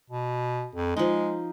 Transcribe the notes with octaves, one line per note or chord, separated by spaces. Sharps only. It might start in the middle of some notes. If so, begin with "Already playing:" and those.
B2
F2
F3 G#3 D#4